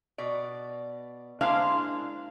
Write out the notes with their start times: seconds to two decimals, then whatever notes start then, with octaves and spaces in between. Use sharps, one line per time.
0.18 B2 D5
1.41 G#3 A#3 D4 E4 C5 F5